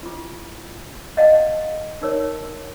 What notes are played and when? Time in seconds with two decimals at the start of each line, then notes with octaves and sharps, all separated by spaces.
0.03 E4 F4
1.17 D5 D#5 F5 F#5 A5
2.02 D#4 A#4 C#5 D5